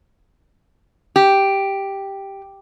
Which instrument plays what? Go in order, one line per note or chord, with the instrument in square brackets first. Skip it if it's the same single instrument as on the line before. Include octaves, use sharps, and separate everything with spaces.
[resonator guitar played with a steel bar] G4